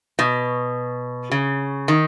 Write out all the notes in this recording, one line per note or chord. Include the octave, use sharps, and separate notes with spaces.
B2
C#3
D#3